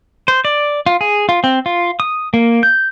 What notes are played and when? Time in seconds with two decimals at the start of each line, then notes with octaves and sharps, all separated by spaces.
0.28 C5
0.45 D5
0.86 F4
1.01 G#4
1.29 F4
1.44 C4
1.66 F4
2.00 D#6
2.34 A#3
2.63 G6